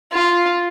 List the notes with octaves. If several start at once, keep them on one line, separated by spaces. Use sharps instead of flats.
F4